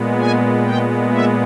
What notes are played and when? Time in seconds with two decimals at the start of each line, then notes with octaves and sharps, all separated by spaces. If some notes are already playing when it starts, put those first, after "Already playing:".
Already playing: A#2 G#3 B3
0.18 G#5
0.64 G5
1.11 E5